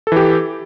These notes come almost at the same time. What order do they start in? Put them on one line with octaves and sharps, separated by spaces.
A4 E3 G4